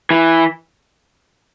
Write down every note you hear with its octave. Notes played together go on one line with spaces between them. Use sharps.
E3